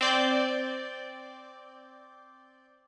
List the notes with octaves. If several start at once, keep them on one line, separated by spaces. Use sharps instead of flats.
C4 D5 G6